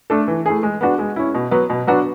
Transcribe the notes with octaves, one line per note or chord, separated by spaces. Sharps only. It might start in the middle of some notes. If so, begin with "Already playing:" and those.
A3 D4 A4
E3
A3 E4 G#4
G#3
B3 D4 F#4
G#3
C#4 E4
B2
F#3 B3
B2
F#3 B3 D4 F#4